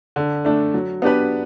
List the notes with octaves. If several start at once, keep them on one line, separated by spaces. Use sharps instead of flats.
D3
A3 D4
F#3
B3 D4 G4 B4